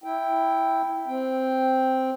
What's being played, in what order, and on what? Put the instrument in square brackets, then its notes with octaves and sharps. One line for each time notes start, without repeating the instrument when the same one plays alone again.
[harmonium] E4 G5
C4 G5